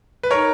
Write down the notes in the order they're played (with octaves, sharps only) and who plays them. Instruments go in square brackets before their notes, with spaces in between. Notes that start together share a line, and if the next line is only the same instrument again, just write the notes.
[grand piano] B4
[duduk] D#4 [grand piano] A#4 C#5